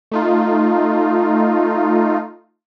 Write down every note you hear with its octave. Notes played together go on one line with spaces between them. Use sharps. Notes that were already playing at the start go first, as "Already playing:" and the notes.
A3 D#4 F4